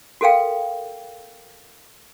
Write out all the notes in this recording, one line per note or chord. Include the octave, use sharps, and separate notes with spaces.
F#4 A4 A#4 F5 G5